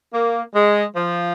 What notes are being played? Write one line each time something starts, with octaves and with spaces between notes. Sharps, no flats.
A#3
G#3
F3